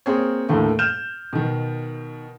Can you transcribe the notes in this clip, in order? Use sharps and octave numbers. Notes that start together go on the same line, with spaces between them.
A#3 C4 G#4 A#4 C#5
D#2 A2 D3 A3 A#3
F6 G6 E7
B2 D#3